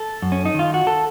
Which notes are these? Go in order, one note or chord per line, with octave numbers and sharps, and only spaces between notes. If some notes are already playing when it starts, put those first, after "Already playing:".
Already playing: A4
F#2
C#4
D#4
D#3 F4
F#4
A4